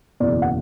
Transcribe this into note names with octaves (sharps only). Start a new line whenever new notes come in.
F#1 E2 B2 D5
F#5